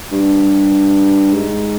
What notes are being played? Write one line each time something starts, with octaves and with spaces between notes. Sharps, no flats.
G2
G#2